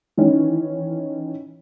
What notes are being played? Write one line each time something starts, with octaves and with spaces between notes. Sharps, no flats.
D#3 E3 C#4